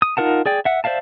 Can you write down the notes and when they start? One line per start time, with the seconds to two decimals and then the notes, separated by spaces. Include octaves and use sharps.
0.02 D#6
0.17 D#4 F4 A#4 F#5 A5
0.46 G#4 D5 G5
0.65 E5 F#5
0.84 C5 D5 E5 F5 A5